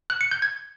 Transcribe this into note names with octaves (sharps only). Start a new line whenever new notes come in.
F#6
C#7
G6
G#6